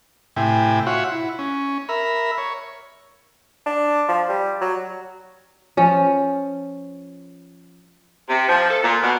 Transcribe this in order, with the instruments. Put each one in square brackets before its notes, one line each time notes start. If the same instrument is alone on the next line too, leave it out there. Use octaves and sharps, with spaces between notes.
[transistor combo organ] A2 C3 E4 G5 G#5
F4 F#4 C#5 E5 F#5
E4
C#4
A#4 E5 B5
C#5
[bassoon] D4
F3
G3
F#3
[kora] F3 C#4
[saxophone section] C3
F3
A4
A#2
B2